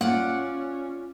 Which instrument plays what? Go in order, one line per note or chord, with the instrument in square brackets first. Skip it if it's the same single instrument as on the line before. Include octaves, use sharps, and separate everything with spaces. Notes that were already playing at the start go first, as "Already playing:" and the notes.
[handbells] A#3 [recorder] C#4 [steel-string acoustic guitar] F4 D5 [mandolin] F#5